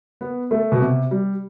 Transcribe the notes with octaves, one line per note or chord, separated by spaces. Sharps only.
B3
A3
B2
C3
G3